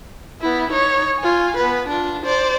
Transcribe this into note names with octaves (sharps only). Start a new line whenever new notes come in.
B3 E4
D#4 C#5
F4 G#5
B3 B4
D4 F4
C5 D5